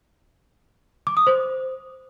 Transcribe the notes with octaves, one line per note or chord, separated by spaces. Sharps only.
D6
D#6
C5